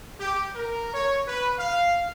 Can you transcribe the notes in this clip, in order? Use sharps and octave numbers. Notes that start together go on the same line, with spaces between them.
G4
A#4
C#5
B4
F5